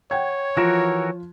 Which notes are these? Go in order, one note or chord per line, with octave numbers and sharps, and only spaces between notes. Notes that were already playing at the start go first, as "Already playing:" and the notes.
C#5 F#5 G5 G#6
E3 F3 F4 F#4 A#4 E7